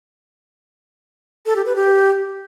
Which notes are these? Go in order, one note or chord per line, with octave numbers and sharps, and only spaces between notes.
A4
G4
B4
G4